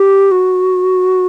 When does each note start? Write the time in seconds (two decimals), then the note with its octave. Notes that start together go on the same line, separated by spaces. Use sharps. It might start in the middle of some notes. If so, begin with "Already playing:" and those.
Already playing: G4
0.31 F#4